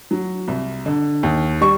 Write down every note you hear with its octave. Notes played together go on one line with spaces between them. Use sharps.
F#3
C2
D3
D#2
G3 C#6